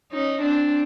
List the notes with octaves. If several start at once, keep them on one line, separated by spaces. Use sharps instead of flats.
C#4 D#4
C4 D4